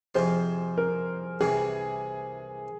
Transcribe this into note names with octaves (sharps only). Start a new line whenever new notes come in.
F2 C3 F3 G#4 C5
A#4
C2 C3 E3 G#4